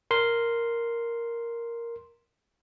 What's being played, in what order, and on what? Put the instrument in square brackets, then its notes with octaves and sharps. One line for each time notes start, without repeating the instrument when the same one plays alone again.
[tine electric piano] A#4 C6